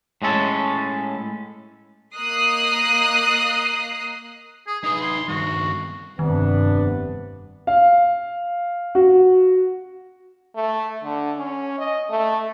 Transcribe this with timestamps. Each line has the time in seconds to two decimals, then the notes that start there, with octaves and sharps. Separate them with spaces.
0.22 A2 G#3 C#4 A4
2.16 A#3 D#5 A#5 D#6 F#6 C7
4.67 G#4
4.83 D#4 G#4 B4
5.01 C6
5.28 G2 D#3 F#4
6.19 F1 G2 C3 D#3 B3 D4
7.67 F5
8.95 F#4
10.56 A3
11.03 D3
11.37 C#4
11.78 D#5
12.10 A3